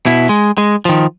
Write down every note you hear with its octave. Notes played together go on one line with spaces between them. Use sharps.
B2 E4
G#3
G#3
D#3 F3